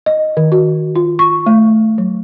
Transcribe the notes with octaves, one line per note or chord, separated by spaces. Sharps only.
D#5
D#3
F#4
F4
C#6
A3
F#3